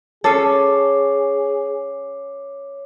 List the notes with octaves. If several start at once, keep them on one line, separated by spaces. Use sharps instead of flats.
C#4 G#4 A4 C#5 D6 C7